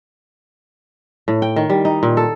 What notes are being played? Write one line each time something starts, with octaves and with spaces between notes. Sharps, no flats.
A2
G5
D#3
G3
D#4
A#2
A4